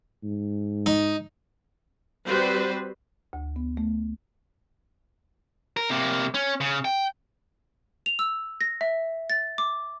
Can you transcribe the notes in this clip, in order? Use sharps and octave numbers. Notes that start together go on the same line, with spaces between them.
G#2
D#4
G3 C4 F#4 B4 C5
D2
B3
A3
A#4
C3 A#3
C#4
C#3
G5
F7
E6
A#6
E5
A6
D6